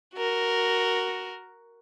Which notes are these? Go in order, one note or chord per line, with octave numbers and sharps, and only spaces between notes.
F#4 A#4